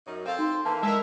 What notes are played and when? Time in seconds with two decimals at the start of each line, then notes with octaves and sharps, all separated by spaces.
0.06 F#2 D#4
0.26 C4 A4 C5 F5
0.39 D#4 C6
0.66 E3 A#3 A5
0.83 G#3 A#4 E5